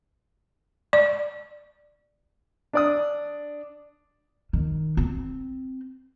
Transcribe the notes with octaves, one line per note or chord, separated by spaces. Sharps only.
D5
D4 D5 D#6
D#3
C4